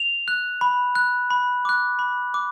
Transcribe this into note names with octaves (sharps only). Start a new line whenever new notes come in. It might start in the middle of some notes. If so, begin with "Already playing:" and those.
Already playing: F7
F#6
B5
F#6
B5
D6 F#6
B5
D6